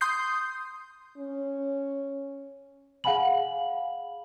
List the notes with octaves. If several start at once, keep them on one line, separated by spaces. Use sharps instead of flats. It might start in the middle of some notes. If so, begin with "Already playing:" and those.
C6 D#6 G6 C7
C#4
G#4 F5 F#5 G#5 B5 F#7